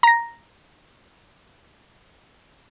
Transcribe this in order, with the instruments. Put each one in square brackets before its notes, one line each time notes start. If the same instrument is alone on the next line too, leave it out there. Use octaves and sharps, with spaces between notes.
[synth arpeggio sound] A#5 A#6